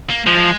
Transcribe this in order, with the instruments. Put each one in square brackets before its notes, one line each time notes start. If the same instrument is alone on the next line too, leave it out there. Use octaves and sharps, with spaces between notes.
[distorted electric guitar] A#3
[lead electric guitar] F3 [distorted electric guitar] G#3